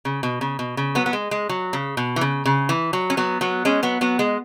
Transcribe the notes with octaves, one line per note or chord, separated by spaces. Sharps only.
C#3
B2
C#3
B2
C#3
F#3 B3
B3
G#3
G#3
F#3
C#3
B2
E3
C#3
C#3
E3
F#3
C#4
F#3 B3
F#3 B3
G#3 C#4
F#3 B3
F#3 B3
G#3